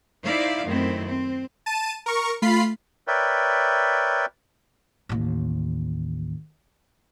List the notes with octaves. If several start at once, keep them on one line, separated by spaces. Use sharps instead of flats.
D#4 E4 C5 D5 E5 F5
F#2 D#3 A3 C4 E4
C4
A5 D#7
A#4 C#6
A3 F4 B5 C7
A#4 B4 C#5 D5 E5 G5
A1 D#2